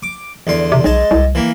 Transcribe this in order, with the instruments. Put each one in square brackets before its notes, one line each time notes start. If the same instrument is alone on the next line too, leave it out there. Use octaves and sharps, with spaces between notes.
[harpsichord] D6
E2 D3 C6
[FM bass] C3
[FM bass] B1 [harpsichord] G#3 A5
[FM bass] C2
[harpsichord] E3 A#3